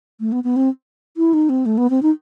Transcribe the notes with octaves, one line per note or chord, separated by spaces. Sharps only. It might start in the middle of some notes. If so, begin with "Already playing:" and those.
A3
B3
B3
C4
E4
D#4
C4
A3
B3
C4
D#4